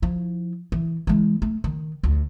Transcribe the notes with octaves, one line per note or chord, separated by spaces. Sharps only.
F3 E4
E3
E3 G#3
A3
D#3
D2 F4